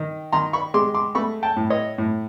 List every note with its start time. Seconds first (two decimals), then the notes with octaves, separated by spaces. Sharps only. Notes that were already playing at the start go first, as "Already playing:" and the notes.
Already playing: D#3
0.32 D#3 A#5 C6
0.53 B5 C#6
0.74 G#3 C6 D6
0.94 C6 D6
1.15 A3 B5 C#6
1.43 G5 A5
1.56 A2
1.70 C#5 D#5
1.98 A2